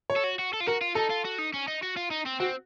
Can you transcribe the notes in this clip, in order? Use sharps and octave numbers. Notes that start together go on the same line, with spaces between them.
C#5
A4
F#4
F#4
A4
F4
F#4 A#4
F4
D#4 A4
F4
F#4
D#4
C#4
D#4
F#4
F4
D#4
C4
C4 F#4